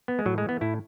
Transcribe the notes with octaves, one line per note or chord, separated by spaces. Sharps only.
B3
G#3
A2 F#3
G#3
E3 B3
A2 E4